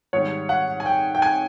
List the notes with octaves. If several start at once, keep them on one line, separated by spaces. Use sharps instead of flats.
G#2 D#3 G3 C#5
F#5
G#5
G5
G5
G#5